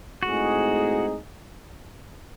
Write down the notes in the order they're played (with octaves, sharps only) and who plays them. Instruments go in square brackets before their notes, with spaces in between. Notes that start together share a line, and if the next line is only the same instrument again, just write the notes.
[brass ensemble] A2 G#3 C4 D#4 G#4 [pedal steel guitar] F#4